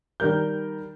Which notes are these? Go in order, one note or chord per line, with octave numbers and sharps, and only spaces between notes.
D#3 G3 A#4 G6